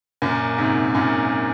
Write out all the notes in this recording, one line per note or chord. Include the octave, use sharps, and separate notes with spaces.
F#2 A#2
G#2 C3
F#2 A#2